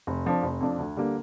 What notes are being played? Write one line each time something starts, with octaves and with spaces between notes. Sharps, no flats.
F1
F2 F3 D4
F1
F2 F3 D4
D2
D3 G3 A#3